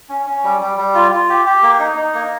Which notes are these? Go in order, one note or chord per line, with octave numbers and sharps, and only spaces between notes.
C#4
C#4
G3
G3
G3
F4
F4
G4
G4
A#3
D#4
D#4
A#3